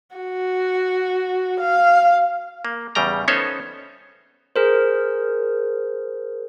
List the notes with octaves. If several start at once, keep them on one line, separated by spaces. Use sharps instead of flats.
F#4
F5
A#3
E2 C#3 G3 G5 A#5
B3 C#4 D#4 A4 C5 C#5
G#4 A#4 C5